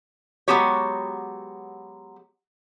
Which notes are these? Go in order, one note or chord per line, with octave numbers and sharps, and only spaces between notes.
F#3 G#3 B3 F#4 G4 C#5